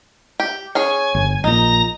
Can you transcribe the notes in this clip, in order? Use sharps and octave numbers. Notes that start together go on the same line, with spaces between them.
G4
C#4 G#4 C#5 G#5
G1
A#1 A#2 D#4 A#5